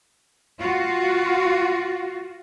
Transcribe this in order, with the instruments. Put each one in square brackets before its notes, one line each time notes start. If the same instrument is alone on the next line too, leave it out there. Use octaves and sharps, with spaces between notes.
[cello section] F4 F#4